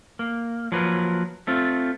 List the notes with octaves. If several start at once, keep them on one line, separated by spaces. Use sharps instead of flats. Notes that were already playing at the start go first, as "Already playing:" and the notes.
A#3
F3 F#3 A#3 B4
A3 C4 F4